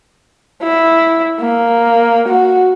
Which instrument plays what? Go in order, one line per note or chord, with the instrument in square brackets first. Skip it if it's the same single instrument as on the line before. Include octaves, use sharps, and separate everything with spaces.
[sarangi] E4
A#3
F#4